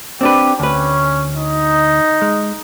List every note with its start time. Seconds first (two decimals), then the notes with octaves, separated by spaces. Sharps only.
0.21 C4 D4 G4 B4
0.60 D2 C#4 B4
1.34 D#4
2.22 G#3